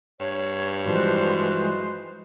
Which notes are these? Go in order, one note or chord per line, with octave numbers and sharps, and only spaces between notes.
G2 C#5
E3 F3 G3 G#3 F#4 B4 C5